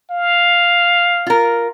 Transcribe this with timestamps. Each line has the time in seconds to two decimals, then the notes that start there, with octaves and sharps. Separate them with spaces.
0.10 F5
1.26 F4 A#4